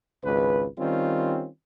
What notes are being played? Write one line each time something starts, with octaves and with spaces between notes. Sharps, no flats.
G#1 C#2 B4
D#3 G3 C4 C#4 F4